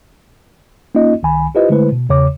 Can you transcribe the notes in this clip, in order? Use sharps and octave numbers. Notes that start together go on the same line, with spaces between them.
A#3 C#4 D#4 F4 D#5
C2 D#3 G#5 B5
E4 F4 G4 B4 C5 D#5
D3 G#3 A3 E4 B4 C5
B2
E2 C#3 C#5 D6